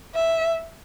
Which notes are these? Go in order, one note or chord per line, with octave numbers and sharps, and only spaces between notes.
E5